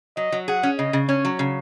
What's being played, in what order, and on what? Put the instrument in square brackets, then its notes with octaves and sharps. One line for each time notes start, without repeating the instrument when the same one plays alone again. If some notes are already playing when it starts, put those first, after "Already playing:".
[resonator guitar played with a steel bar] F#3 [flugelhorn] D#5
[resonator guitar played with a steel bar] F#3
[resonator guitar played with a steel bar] G#4 [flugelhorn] F#5
[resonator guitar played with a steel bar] C#4
[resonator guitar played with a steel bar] C#3 [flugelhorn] D#5
[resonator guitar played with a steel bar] C#3
[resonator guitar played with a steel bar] C#4 [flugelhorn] C#5
[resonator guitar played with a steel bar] F#3
C#3